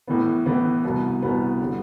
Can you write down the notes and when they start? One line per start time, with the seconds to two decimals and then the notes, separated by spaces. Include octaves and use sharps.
0.08 A2 E3 B3
0.46 A2 E3 B3
0.84 C2 B2 B3
1.22 C2 B2 B3
1.61 D3 G3